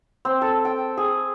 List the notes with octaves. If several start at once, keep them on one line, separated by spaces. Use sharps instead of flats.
C4
A4
G5
G#4